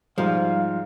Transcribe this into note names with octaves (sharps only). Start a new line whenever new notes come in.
G#2 F3 G3 F4 F5